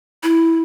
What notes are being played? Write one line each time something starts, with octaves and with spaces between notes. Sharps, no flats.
E4